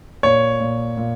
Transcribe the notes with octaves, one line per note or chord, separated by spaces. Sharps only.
A#2 C#5
A#2
A#2